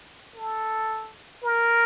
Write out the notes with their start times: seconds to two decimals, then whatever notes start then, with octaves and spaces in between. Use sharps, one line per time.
0.36 A4
1.44 A#4